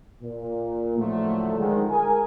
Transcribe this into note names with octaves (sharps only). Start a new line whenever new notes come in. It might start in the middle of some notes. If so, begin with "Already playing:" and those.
A#2
A2 D3 F3 F#3 A3
D3 D#3 F3 G#3
G#4 A#4 G#5